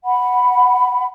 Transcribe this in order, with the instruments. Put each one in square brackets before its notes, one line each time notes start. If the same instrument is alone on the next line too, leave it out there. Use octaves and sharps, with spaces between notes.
[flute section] F#5 B5